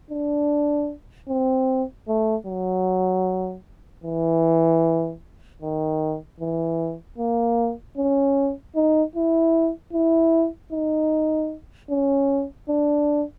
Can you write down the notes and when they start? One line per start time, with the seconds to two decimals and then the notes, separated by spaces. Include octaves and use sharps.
0.10 D4
1.29 C4
2.08 A3
2.47 F#3
4.04 E3
5.62 D#3
6.40 E3
7.18 A#3
7.97 C#4
8.76 D#4
9.15 E4
9.93 E4
10.72 D#4
11.90 C#4
12.69 D4